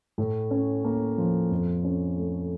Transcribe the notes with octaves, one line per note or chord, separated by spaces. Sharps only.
A2
C#4
A#3
F3
F2
C#4
A3